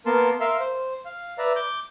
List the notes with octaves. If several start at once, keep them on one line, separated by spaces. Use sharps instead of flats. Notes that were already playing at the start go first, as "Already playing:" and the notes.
A#3 B3 A#4 A5 C6
A#4 E5 F5 C6
C5
F5
B4 D5 E5 A#5
D6 G6